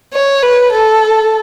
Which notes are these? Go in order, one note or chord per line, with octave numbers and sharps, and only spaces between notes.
C#5
B4
A4